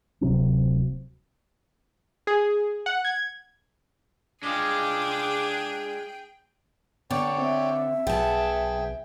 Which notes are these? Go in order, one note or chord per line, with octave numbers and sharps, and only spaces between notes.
D1 C3 F#3 C4
G#4
F#5
G#6
G#3 D4 F4 G#4 G5 D6
D3 B3 C#5 D5 G5
C4 E5
B1 B3 G#4 G5 A5